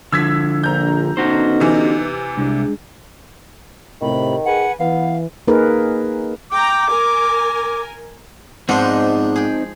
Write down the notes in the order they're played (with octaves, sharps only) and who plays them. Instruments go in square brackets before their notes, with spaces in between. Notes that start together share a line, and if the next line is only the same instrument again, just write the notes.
[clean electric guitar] D3 F3 [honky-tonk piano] E6 G#6 B6
[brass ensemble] A#1 [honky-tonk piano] A#5 G6
[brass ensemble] D3 B3 D#4 [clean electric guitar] C#4 F#4 C5
[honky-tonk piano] C3 E3
[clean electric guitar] C2 [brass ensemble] G#3 D4
[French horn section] A2 C3 [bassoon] D#3 [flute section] B5
[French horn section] G#4 [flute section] B4 F#5 G#5
[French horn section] E3 [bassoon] B3 [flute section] F5
[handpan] A#3 D#4 G#4 A#4 B4
[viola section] G5 A#5 [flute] D6
[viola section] A#4 G#5
[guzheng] G#2 F3 [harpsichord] B3 D4 [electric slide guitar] C4 D#4
[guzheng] G#4 G5